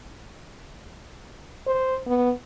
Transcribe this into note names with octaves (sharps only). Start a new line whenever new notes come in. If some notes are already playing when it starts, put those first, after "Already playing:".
C5
B3